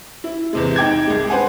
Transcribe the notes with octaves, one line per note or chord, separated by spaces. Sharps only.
E4
E2 C3 G#3
D#4 G5 D6 G#6
C2 G#3
B4 C5 F#5 G#5